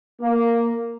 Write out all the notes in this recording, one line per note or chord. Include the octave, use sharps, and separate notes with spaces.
A#3